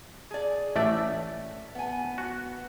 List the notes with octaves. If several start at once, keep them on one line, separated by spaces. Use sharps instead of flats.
G#4 D5
A1 A3 D5 E5
B3 G#5
F#4